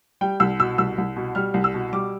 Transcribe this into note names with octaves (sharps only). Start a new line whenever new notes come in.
G3 G5
C2 E6
B2 E6
C2 E6
C2
B2
G3 F6
C2
E6
B2
G3 D6